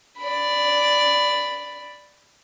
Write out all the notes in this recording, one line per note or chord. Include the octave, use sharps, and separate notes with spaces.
D5 B5